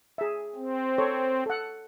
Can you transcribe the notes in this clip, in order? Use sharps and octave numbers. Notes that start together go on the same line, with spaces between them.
G#4 E5
C4
A4 C5 C#5
A4 F#5